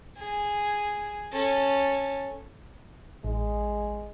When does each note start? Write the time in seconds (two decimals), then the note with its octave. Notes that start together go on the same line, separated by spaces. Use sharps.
0.19 G#4
1.33 C#4 A4
3.24 A1 G#3